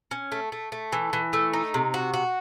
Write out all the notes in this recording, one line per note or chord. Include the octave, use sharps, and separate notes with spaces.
C#4
A3
A3
A3
E3
E3
A3
D#4
C3
F#4
F#4